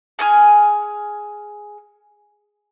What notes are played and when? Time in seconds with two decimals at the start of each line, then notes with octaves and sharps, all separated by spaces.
0.19 G#4 G#5 F6